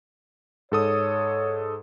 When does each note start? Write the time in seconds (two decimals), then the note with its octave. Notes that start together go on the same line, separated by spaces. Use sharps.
0.72 G#2 A4 C#5 D#6